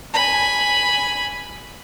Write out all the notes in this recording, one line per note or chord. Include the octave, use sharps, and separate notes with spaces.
G#5 B5